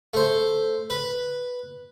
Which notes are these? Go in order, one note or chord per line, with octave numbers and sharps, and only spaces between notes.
A3 C5
B4